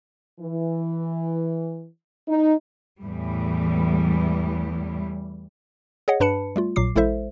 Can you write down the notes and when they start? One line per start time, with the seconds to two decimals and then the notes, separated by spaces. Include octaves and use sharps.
0.39 E3
2.28 D#4
3.01 E2 A2 E3 G3
6.08 G#4 C#5 D#5 F#5
6.20 G2 D4 B4 A5 B5 C#7
6.56 G3 A3 F4
6.76 A#1 A#2 F#3 D6 C7
6.96 A1 G#3 E4 A4 C5 E5